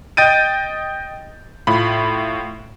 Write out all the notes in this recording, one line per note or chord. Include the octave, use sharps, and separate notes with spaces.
D#5 G5 G6 A6 D7 D#7
A2 F4 B5